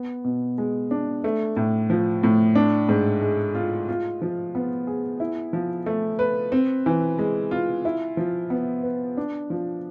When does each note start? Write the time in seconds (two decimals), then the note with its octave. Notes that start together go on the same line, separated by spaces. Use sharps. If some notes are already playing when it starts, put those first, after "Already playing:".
Already playing: B3
0.24 B2
0.58 G#3
0.91 D4
1.24 A3
1.56 A2
1.90 F3
2.23 A2
2.55 D4
2.89 G#2
3.22 G#3
3.55 F4
3.88 F4
4.22 F3
4.55 B3
4.87 G#4
5.20 E4
5.53 F3
5.86 A3
6.19 B4
6.52 C4
6.86 E3
7.19 G#3
7.51 F4
7.85 E4
8.17 F3
8.50 B3
8.83 B4
9.17 D4
9.50 F3